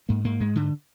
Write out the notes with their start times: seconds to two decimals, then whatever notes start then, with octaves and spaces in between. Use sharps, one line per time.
0.09 G#2 A#3
0.24 G#2 A#3
0.40 G#2 G#3
0.56 G#2 D3